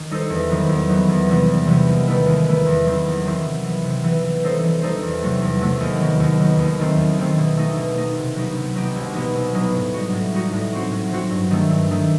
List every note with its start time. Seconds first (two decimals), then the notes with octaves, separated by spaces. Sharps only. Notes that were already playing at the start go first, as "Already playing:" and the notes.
Already playing: D#3
0.11 G3 D#4 A4 C5
0.30 E2
0.50 D#3 F#3 B3
0.69 E2
0.89 D#3 F#3 B3
1.09 E2
1.29 C3 E3 G3 B3
1.48 E2
1.67 C3 E3 G3 B3
1.87 D#2
2.07 D#3 A3 E4 B4
2.26 D#2
2.46 D#3 A3 E4 B4
2.66 E2
2.86 D#3 F#3 C4 E4
3.06 E2
3.25 D#3 F#3 C4 E4
3.44 C3
3.64 E3 B3
3.84 C3
4.04 E3 B3
4.23 E3
4.43 G3 D#4 A4 C5
4.63 E3
4.82 G3 D#4 A4 C5
5.03 E2
5.22 C3 F#3 A3
5.42 E2
5.61 C3 F#3 A3
5.81 D#2
6.00 D#3 F#3 B3
6.20 D#2
6.39 D#3 F#3 B3
6.59 D#2
6.79 D#3 A3 C4
6.98 D#2
7.19 D#3 A3 C4
7.38 B2
7.57 A3 D#4
7.77 B2
7.97 A3 D#4
8.17 C3
8.36 F#3 B3 D#4 G4
8.57 C3
8.75 F#3 B3 D#4 G4
8.96 C2
9.15 B2 F#3 B3 D#4
9.35 C2
9.54 B2 F#3 B3 D#4
9.75 A2
9.94 G3 D#4 F#4
10.13 A2
10.34 G3 D#4 F#4
10.52 A2
10.72 F#3 C4 F#4
10.92 A2
11.12 F#3 C4 F#4
11.31 G2
11.51 D#3 A3
11.70 G2
11.91 D#3 A3